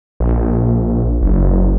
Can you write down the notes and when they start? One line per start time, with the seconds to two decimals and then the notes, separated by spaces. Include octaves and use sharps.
0.20 A#1
1.21 F#1